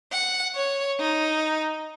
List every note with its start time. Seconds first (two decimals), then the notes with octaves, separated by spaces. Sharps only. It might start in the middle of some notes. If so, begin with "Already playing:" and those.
0.12 F#5
0.55 C#5
0.99 D#4